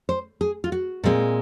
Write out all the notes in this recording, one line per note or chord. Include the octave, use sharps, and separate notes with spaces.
C5
G#4
F4
F#4
A#2 G#3 C4